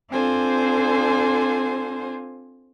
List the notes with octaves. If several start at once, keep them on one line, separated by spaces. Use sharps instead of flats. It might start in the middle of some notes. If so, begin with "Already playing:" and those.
C4 D4 F4 A4 C5 G#5